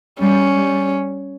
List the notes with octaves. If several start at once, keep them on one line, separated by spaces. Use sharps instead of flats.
G3 C#4
G3